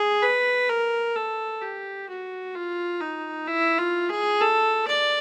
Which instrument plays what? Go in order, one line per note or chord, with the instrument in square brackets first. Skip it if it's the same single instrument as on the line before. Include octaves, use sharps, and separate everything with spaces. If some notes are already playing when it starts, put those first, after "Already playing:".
Already playing: [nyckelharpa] G#4
B4
A#4
A4
G4
F#4
F4
D#4
E4
F4
G#4
A4
D5